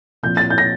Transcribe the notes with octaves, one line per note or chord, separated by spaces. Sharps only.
A#2 F3 C4 F4 G6
A6
G6
A#6